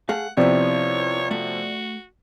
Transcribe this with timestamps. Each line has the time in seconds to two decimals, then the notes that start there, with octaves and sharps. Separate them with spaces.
0.09 A3 G#4 F5 F#5
0.37 C3 F3 B3 C4 E4 C#5 D5
1.31 A3 F#4